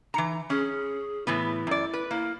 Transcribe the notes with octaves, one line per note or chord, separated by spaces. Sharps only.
E3 D#4 A#5
C#4 G#4
A2 E3 B3 E4
F#2 D5
B4
A#3 E4